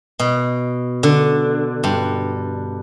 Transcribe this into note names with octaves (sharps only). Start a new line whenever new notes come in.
B2
D3
G2